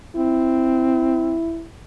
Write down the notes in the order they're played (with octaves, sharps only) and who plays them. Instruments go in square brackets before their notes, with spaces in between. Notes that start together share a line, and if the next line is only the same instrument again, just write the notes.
[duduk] C4 [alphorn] E4